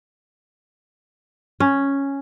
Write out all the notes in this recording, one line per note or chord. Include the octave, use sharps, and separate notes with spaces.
C#4